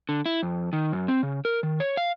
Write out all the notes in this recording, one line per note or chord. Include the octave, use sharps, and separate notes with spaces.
D3
E4
F2
D#3
F#2
C4
C#3
A#4
D#3
C#5
F5